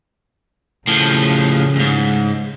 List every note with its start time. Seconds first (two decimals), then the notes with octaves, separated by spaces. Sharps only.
0.87 A2 C#3 F3
1.76 D2 G#2